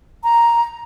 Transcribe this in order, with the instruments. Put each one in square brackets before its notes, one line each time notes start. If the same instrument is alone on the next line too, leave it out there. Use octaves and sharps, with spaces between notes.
[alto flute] A#5